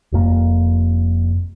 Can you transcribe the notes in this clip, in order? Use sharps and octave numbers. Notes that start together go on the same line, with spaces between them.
F1 F2 A#3